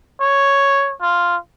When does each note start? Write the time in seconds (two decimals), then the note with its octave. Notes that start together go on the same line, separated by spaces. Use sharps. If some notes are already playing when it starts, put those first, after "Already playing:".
0.21 C#5
1.01 F4